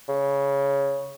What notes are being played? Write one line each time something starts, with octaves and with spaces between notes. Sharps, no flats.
C#3